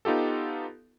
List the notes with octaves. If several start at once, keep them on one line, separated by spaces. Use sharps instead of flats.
B3 D#4 F4 G4 A4